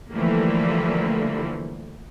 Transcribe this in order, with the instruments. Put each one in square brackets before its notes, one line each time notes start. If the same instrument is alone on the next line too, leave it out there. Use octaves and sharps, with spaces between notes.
[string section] D3 E3 F3 G3 A3 A#3